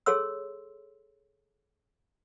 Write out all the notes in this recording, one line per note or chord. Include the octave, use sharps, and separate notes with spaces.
G#4 A4 C#5 C6 E6